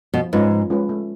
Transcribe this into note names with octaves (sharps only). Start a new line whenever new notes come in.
B2 F3
G#2 G#3 C#4 F4 B4
F3
G#3 C#4 F4 B4
A3